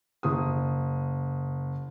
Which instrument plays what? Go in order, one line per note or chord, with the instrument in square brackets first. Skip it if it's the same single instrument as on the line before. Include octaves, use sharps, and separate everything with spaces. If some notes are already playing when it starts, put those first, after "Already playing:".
[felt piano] F#1 D#6